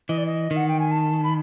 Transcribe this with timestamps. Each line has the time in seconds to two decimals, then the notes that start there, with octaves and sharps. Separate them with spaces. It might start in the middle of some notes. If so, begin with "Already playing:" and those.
0.09 E3 D#5
0.18 D5
0.26 D#5
0.51 D#3
0.56 F#5
0.68 G5
0.80 G#5
0.91 A5
1.24 B5